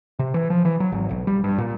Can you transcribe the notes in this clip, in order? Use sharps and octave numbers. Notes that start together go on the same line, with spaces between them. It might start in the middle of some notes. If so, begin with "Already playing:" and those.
C3
E3
F3
E3
F#3
G#1
B1
G3
G2
A#2